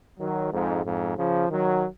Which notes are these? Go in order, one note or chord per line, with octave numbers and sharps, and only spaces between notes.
D#3 F#3
F2 G#2
F2 G#2
C#3 F3
D#3 F#3